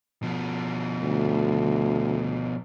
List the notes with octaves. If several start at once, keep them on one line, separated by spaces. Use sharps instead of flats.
B2 F3
D2